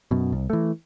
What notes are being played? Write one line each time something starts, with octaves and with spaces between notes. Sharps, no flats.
F#2 B2
C2
E3 A3